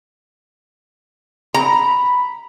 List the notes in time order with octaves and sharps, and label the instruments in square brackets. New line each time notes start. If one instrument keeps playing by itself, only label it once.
[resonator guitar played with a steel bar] A#5 [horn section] B5